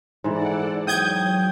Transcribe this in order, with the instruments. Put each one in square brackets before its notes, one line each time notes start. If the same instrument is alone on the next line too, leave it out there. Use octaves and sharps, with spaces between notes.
[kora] G#2 E3 [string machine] A4 D5 F#5
[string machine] F#3 [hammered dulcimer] G5 [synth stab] D#6 G6 G#6